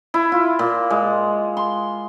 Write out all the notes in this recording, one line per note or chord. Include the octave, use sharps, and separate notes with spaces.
E4
F4
A#2
G#3
C6